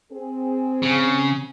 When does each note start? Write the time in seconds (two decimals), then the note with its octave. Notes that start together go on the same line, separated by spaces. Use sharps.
0.13 C4 G#4
0.83 C#3